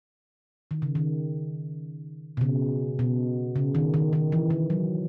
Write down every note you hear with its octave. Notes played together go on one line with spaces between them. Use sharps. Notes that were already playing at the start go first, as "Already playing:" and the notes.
D#3
C#3
D#3
B2
C#3
B2
C#3
D#3
D#3
D#3
E3
D#3
F#3